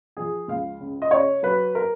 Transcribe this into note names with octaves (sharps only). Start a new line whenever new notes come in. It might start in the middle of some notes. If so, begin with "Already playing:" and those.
F3 G#4
C#2 F5
C#3
D#5
C#3 C#5
F#3 B4
A#4